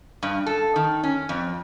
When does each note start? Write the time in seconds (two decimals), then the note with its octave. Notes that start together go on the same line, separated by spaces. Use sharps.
0.23 G2
0.46 A4
0.76 D#3
1.03 C#4
1.29 F2